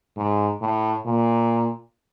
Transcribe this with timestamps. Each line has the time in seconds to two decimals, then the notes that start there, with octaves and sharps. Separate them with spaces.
0.16 G#2
0.61 A2
1.06 A#2